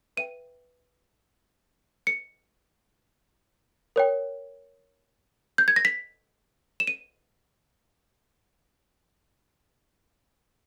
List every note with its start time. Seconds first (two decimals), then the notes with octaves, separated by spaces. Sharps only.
0.17 B4 E5 G5 D#7
2.07 C#7
3.96 A#4 C#5 G5
5.58 G6
5.68 G#6
5.76 A#6
5.85 B6
6.80 E7
6.87 D#7